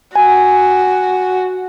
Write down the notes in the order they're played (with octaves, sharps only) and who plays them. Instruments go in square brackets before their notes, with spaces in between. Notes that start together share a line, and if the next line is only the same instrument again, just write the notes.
[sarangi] F#4 [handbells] G#5